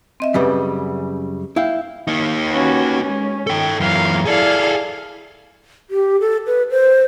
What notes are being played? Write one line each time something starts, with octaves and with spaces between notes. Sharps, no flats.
C4 D#5 E5
F#2 C#3 G3 B4
E4 F5 G5
A#3 D#4
C#4 F#4 B4
G#3 C#4
D#3 A4 G5
F#2 E3 A#4 F5 A#5
E4 G#4 A4 D5 F5
G4
A4
B4
C5